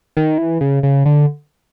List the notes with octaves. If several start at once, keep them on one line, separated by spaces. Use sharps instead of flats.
D#3
E3
C#3
C#3
D3